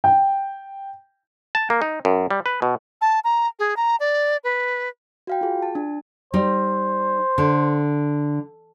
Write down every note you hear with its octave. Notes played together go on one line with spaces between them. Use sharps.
G5
A5
A#3
D#4
F#2
G3
B4
B2
A5
A#5
G#4
A#5
D5
B4
F#4 F5 G5
F4 G#4
A5
D4
G3 D#4 C5
D3